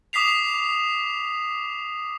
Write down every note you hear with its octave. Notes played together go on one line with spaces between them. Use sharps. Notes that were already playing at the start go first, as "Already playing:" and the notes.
D6 D#6 B6 C7 F7